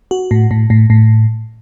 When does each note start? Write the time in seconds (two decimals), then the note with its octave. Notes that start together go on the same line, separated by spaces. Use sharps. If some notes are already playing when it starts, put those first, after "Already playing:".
0.11 F#4
0.31 A2
0.51 A2
0.70 A2
0.90 A2